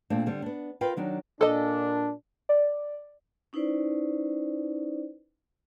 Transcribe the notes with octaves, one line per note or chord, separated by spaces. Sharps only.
A#2 A3 C4 D4
D3 G3 C4
B3 D4
F4 A#4 B4 G5
D#3 F#3 D4 D#4
A#2 D4 A4 D#5
D5
C#4 D#4 E4 B4 C5 D5